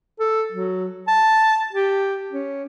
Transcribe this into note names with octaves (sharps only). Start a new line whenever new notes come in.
A4
F#3
A5
G4
C#4